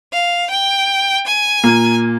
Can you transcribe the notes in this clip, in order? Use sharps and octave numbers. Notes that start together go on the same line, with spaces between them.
F5
G5
G#5
A#2 A#3